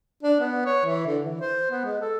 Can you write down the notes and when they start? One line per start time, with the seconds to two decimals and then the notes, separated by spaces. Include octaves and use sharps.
0.23 D4
0.40 B3
0.65 C#5
0.85 E3
1.06 D3
1.24 E3
1.41 C5
1.71 B3
1.85 G#3
2.01 A4